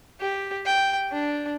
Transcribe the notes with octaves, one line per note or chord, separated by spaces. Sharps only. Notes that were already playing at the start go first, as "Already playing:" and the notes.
G4
G5
D4